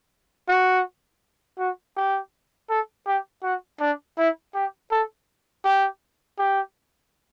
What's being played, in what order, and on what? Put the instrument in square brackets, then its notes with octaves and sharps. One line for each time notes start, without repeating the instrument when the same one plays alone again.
[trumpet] F#4
F#4
G4
A4
G4
F#4
D4
E4
G4
A4
G4
G4